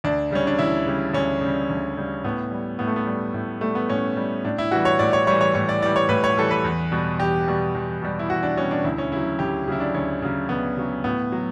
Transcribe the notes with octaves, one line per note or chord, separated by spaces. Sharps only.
D2 D4
C#3 G3 C#4
D4
D2 E4
C#3 G3
D2 C#4
C#3 G3
D2
C#3 G3
A2 B3
G3
A2 B3
A3
B3
G3
A2
G3 A3
B3
A2 C#4
G3
A2 D4
E4
E3 G3 F#4
C#5
A2 D5
C#5
E3 G3 C#5
C#5
A2 C#5
D5
E3 G3 D5
C#5
A2 B4
C#5
E3 G3 A4
B4
E2
B2 G3
E2 G4
B2 G3
E2
B2 G3
E4
E2 F#4
D4
B2 G3 C#4
D4
D2 E4
C#4
C#3 F#3 E4
D2 G4
C#3 F#3 E4
D4
D2 C#4
C#3 F#3
D2 B3
C#3 F#3
A2 B3
F#3